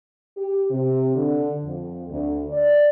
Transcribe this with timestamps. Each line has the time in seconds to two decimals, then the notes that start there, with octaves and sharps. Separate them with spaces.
0.37 G4
0.69 C3
1.16 D3
1.65 F2
2.09 D2
2.50 D5